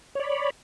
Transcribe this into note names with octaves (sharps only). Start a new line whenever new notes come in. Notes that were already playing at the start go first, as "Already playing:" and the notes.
C#5 D5 B5